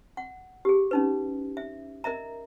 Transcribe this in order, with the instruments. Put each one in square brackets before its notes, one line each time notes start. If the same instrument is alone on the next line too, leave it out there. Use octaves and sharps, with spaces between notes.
[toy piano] F#5
G4 G#4
C#4 D#4 B4
E5
A#4 D#5 E5 A#5